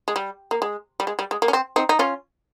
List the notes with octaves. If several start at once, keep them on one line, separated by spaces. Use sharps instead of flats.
G#3
G3
A#3
G#3
G3
G#3
G3
G#3
A#3
C#4
C4
C4 D#4
D#4
C#4 F4